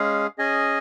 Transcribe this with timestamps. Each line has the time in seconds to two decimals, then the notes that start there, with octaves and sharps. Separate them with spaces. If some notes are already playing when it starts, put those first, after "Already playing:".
Already playing: G#3 C#4 G#4 F5
0.38 C#4 G#4 D#5 G#5